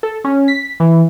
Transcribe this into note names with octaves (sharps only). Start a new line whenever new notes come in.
A4
C#4
B6
E3